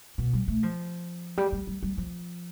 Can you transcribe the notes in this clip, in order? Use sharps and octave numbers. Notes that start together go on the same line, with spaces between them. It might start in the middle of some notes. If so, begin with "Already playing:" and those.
B2
G3
A3
F3
G3
G3
G3
G3
F3